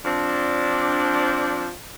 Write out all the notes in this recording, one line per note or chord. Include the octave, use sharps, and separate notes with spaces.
F3 C4 D4